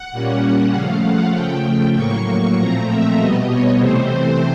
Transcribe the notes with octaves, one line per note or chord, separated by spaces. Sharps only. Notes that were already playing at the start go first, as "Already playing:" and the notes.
Already playing: F#5
A#2 G3 A#3 C#4
C#3 F3 A3 F5
F#5
C#3 F3 A3 G5
A2 F#3 A#3 C#6
A#2 F3 A3 C4 A#5
E5
B2 G3 B3 D#5
C#5
C3 E3 A3 C4 C5